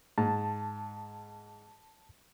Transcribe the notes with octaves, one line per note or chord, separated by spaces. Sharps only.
G#2 A5